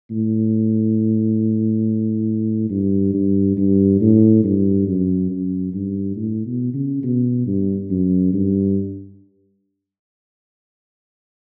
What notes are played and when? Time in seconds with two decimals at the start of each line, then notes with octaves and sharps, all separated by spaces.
0.11 A2
2.70 G2
3.14 G2
3.57 G2
4.01 A2
4.44 G2
4.87 F#2
5.31 F#2
5.74 G2
6.16 A2
6.46 B2
6.74 C#3
7.04 B2
7.47 G2
7.90 F#2
8.33 G2